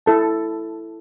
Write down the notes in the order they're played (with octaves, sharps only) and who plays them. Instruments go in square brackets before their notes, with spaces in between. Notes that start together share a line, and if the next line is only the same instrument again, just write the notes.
[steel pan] E4 A4 A5